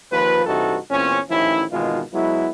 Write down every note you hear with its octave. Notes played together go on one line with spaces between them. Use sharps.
D#2 F3 F4 B4
G2 C3 E3 D#4 F#4 A4
E2 A#2 C4 C#4
A1 D#3 F3 C#4 E4
G#1 B2 D#3 E3 G#3 F4
F#3 G#3 B3 E4